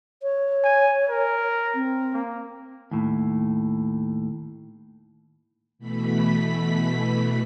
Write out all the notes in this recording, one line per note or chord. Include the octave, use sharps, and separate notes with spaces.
C#5
G#5
A#4
C4
A#3
D#2 A2
B2 E3 A3 B5 B6